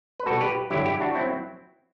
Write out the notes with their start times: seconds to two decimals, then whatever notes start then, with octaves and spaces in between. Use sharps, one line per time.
0.20 B4
0.26 B2 G3 F#4 A4
0.41 G4 B4
0.70 G2 D3 F#3 E4 G4
0.86 E4 G4
1.00 D4 F#4
1.15 F#3 C4 E4